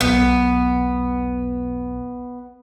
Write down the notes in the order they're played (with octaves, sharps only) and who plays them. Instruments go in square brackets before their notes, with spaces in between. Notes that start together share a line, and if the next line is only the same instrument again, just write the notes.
[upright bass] E1 B1 [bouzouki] B3